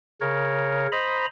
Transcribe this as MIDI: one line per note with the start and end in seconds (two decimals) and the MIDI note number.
0.21 0.87 49
0.21 0.87 70
0.21 0.87 73
0.92 1.26 72
0.92 1.26 75
0.92 1.26 82
0.92 1.26 83